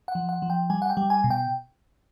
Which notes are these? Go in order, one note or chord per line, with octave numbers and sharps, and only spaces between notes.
F#5
F3
F#5
F3
G5
G3 G#5
F#5
G5
G3
G#5
B2
G5